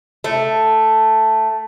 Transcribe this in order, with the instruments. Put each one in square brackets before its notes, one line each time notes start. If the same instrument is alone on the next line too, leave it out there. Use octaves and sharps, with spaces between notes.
[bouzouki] A3